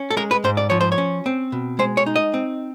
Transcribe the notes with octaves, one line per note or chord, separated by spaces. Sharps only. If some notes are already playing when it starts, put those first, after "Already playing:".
Already playing: C#4
A4
G#3 A#4
B4
G#2 C5
D5
F3 C#5
C5
C#5
C#4
C4
B2
G#3 C5
C#5
D#4
D#5
C4